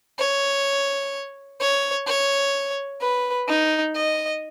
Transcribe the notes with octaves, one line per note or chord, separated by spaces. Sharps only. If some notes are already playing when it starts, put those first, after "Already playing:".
C#5
C#5
C#5
B4
D#4
D#5